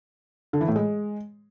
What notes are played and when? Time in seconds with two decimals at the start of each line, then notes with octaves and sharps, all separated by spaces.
0.53 D3
0.61 E3
0.68 A2
0.76 G#3